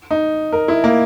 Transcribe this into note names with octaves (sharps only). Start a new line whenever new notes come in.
D#4
A#4
E4
A#3